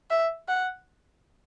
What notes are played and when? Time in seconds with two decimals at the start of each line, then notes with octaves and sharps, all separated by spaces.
0.11 E5
0.48 F#5